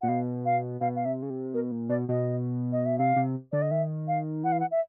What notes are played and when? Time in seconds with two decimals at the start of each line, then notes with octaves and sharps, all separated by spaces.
0.01 A#2 F#5
0.08 B2 F5
0.45 F5
0.81 B2 F5
0.96 F5
1.05 C3 E5
1.22 C#3
1.30 C3
1.54 B2 A#4
1.72 A#2
1.89 B2 D5
2.09 B2 D#5
2.72 D#5
2.86 E5
2.98 C3 F5
3.16 C3
3.52 D3 D5
3.62 D#5
3.71 D#3 E5
4.08 F5
4.43 E3 F#5
4.52 F5
4.60 F#5
4.71 E5